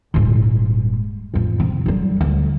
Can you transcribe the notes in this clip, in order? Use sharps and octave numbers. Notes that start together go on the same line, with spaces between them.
D#1 G#2
A1 F2
C3
F#3 G3
D2